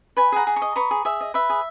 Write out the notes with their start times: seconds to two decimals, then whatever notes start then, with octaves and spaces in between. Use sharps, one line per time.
0.17 B4 G#5 B5
0.32 G#4 F#5 A#5
0.47 G#4
0.56 A#5 C#6
0.62 D#5
0.76 B4 A#5 C#6
0.91 G#4
1.05 G#4 E5
1.21 D#5
1.34 B4 E5
1.50 G#4